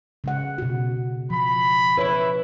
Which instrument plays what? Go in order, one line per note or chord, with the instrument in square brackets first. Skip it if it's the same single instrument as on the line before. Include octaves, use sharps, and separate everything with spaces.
[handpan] C#3 G#3 F#5
B2 F#4
[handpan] F3 [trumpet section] B5
[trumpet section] E4 [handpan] B4 C#5